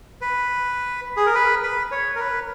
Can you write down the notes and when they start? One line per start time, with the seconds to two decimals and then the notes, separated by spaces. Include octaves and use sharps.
0.21 B4
1.17 G#4
1.26 A#4
1.35 B4
1.63 B4
1.91 C#5
2.15 A#4
2.20 B4